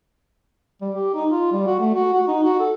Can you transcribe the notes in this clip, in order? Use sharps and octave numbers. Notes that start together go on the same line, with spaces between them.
G3
G4
D#4
F4
G3
F#4
A3
F#4
F#4
D#4
F#4
A4